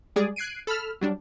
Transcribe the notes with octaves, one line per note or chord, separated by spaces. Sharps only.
G3 G#3 G#4 D5
F#6 G#6 C7 D7 D#7
A4 B5 E6 F6
F#3 G3 D4